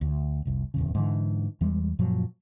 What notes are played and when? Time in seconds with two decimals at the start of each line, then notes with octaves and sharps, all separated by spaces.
0.01 D2
0.45 F1 C2
0.74 D1 E2 C#3
0.95 G#2 D3 E3
1.61 E2 E3 G3 G#3
1.99 F#2 A#2 F3 F#3